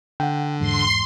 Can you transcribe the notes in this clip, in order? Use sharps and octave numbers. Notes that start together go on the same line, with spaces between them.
D3 F#5 G5
E2 G#2 C6